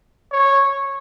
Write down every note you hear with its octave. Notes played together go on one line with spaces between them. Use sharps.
C#5